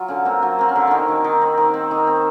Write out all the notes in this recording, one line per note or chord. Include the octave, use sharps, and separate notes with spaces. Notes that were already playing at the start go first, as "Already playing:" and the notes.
Already playing: F#3 F4
D3 C#4
A#3 C4
F#3
A#3 C4
C#4
D3
D#3 C4 C#4
D#3
D#3
C4
D#3
C4
D#3
C4